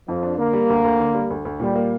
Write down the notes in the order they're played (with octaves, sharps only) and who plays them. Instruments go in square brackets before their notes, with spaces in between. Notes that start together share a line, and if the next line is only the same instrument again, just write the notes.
[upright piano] F2 [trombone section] F3
[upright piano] D4
[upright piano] D3 [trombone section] A#3
[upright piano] G3
D2
D2
D3
G3
D2
D2
[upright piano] A#2 [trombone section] G3
[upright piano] A#3